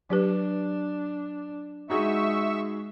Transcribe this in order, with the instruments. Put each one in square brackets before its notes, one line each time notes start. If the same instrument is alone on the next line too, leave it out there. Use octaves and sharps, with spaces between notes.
[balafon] F#3 G4 B4 [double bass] D4
[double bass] G#3 [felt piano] D#4 F#4 G#4 [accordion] E5 C#6 E6